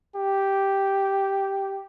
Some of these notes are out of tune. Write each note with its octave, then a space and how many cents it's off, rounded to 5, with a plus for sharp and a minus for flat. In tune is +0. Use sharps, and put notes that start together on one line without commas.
G4 -5